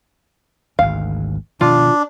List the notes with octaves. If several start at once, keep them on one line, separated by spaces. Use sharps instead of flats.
G#1 D2 F5
B2 D#3 F3 D4 F4